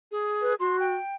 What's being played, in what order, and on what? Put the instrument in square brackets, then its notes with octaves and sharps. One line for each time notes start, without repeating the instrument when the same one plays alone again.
[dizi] G#4
[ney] B4
[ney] F#4 [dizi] C6
[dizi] G5